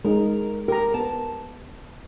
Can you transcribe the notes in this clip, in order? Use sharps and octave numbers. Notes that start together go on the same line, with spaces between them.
G#3 D#4 A#4
G4 A#4 G5 A#5
B3 A#4 A5